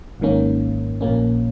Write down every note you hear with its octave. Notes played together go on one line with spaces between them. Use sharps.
G#1 G#2 D#3 A#3 C#4
A#1 A#2 A#3 C#4